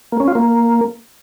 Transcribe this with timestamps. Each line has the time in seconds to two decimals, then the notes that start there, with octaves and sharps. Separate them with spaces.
0.12 A#3
0.20 C#4
0.28 F4
0.35 A#3